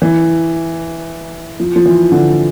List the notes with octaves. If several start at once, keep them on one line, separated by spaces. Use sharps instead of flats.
E3
F3
F3
E3
D3